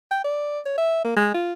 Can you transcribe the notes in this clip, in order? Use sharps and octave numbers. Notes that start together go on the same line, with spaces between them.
G5
D5
C#5
E5
A#3
G#3
F4